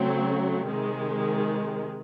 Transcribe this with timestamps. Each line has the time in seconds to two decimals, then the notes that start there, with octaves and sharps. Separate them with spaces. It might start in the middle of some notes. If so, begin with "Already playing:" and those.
Already playing: C#3 F#3 A3 C4
0.67 C3 D#3 G#3